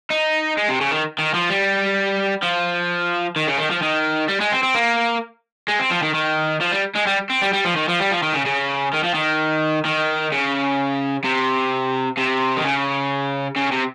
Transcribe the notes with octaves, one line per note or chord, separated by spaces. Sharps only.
D#4
G#3
C3
C#3
D#3
D#3
F3
G3
F3
D#3
C#3
D#3
F3
D#3
G3
G#3
C4
C4
A#3
G#3
C4
F3
D#3
D#3
F3
G3
G#3
G3
C4
G3
G3
F3
D#3
F3
G3
F3
D#3
C#3
C#3
D#3
F3
D#3
D#3
C#3
C3
C3
D#3
C#3
C#3
C3